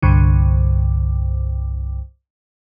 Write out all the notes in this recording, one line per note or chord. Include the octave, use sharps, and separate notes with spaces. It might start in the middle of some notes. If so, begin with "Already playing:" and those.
C2 G2 D3